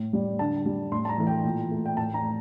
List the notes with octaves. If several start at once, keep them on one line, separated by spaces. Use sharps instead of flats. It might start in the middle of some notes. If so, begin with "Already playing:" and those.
Already playing: A2
G3
D3 A5
G3
A2 C6
A5
A#5
E3 A3
G5
A#2
A3
G5
A2 A5
A#5
A3